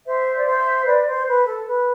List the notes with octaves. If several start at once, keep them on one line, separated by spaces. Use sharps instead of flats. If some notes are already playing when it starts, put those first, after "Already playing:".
C5 E5
D5
C5 E5
B4 D5
C5
B4
A4
B4